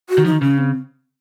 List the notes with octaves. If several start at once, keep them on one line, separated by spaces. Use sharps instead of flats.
F#4
D#3
F3 D#4
D#3
C#3 C#4
C4